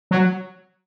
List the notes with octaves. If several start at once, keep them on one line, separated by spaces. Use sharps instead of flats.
F#3